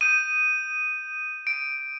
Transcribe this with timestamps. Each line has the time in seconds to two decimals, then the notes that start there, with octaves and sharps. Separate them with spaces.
0.01 D#6 G6 D#7
1.47 D7